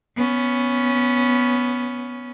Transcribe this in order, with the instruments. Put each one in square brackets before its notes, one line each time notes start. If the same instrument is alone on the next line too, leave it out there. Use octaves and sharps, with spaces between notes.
[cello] B3 C#4